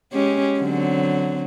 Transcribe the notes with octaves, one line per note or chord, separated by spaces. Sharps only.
G#3 C#4 G4
D3 F#3 C4